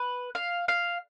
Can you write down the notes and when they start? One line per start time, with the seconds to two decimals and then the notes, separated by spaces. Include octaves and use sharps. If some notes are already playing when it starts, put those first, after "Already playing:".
Already playing: B4
0.35 F5
0.68 F5